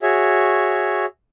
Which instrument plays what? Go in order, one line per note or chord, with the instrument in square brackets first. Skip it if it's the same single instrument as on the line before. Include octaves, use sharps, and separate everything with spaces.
[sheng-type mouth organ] F#4 G#4 C#5 E5